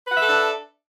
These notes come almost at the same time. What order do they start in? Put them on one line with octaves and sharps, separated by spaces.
B4 F#5 E5 A4 D4